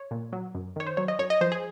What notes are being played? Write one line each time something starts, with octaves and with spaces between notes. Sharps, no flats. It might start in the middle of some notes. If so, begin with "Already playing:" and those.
Already playing: C#5
A#2
F#3
F#2
D#3 C#5
C5
F#3 C#5
D#5
F#2 C#5
D#5
F3 C5
G#4